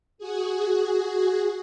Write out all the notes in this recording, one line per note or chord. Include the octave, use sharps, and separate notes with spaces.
F#4 G#4